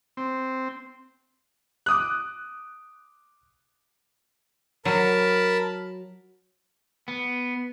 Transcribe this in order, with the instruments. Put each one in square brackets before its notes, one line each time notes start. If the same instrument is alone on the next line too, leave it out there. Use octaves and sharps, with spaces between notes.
[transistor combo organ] C4
[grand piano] D6 D#6 F#6
[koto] F#3 [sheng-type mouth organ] A#4 A5 B5
[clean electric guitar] B3